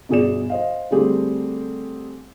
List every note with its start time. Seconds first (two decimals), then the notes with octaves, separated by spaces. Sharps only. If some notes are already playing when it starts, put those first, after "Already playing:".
0.09 G1 B2 G#4 D5 E7
0.50 C5 D#5 F5
0.91 D3 G3 A3 C4 G4 G#4